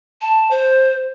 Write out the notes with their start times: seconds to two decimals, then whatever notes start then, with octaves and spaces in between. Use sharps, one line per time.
0.21 A5
0.51 C5